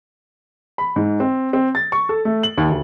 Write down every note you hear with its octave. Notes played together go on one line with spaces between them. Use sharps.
B5
G#2
C4
C4
A6
C#6
A4
A3
F#7
D#2
D2